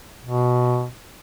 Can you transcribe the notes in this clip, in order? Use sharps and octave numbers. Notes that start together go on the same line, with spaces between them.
B2